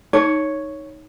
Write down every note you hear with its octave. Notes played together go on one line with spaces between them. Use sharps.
D#4 C#5 A5